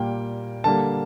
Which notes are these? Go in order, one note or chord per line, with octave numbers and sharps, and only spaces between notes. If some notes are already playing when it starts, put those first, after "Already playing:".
Already playing: A#2 G3 A#3 G5
D3 G3 A#3 A5